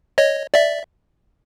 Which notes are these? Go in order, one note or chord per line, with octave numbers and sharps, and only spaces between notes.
C#5 D#5
D5 E5